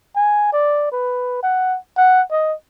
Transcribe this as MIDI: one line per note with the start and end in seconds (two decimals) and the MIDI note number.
0.16 0.49 80
0.53 0.91 74
0.92 1.42 71
1.43 1.78 78
1.97 2.22 78
2.31 2.54 75